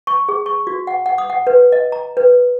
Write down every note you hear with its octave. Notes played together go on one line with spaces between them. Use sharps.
C#6
G#4
C#6
F#4
F#5
F#5
D#6
F#5
B4
D#5
A#5
B4